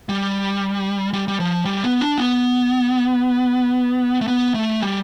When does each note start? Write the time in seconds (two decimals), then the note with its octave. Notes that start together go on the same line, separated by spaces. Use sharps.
0.09 G3
1.13 G3
1.28 G3
1.40 F3
1.65 G3
1.83 B3
2.01 D4
2.18 B3
4.21 A3
4.28 B3
4.54 A3
4.80 G3